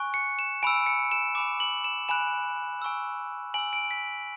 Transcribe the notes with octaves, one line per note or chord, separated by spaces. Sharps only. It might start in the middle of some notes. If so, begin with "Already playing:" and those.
Already playing: G#5 C#6 F#6
C#7
E7
G#5 B5 E6 D7
C#7
E7
G#5 B5 D6 E7
F#7
E7
G#5 B5 F#6 E7
G#5 C#6 E6
G#5 B5 E6 F#7
D7
B6